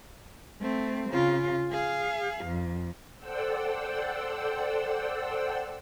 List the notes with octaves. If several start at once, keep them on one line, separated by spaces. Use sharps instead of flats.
A3 C4
C#3 F4
G#4 F5
F2
A4 C5 D5 F#5 G5 E6